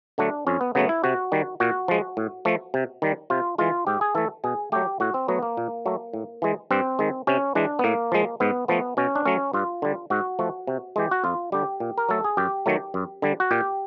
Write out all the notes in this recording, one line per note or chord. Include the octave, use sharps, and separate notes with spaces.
D3 F#3 A3 D4
F2 C#4
B3
C#3 F#3 A3 B3
E4
C3 F#4
D#3 G3
A#2 F#4
F3 G#3
A2
F3 A3
C3
D#3 G3
C3 F4
E3 G#3 F4
G#2 G4
G#4
E3 A3 A4
B2 G#4
F#3 A3 G4
A2 F#4
C4
F#3 A3 B3
A#3
A#2
F#3 A3
A2
E3 G#3
G2 C4
D#3 G#3
C3 C#4
E3 G#3 D4
B3
A2 A#3
F3 G#3
G#2 B3
F3 A3 B3
B2 C#4
D4
F#3 A3 C#4
G2 F4
D3 G3
G#2 F#4
F3 A3
C3
E3 G#3 G4
F#4
F2 F4
D3 G3 G4
A#2
A#4
F#3 A3 A4
G#4
F#2 G4
D#3 F#3 A3
F#2
D3 G3
F#4
A#2 G4